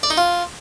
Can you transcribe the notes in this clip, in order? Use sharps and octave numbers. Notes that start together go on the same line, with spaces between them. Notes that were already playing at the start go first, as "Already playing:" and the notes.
D5
D#4
F4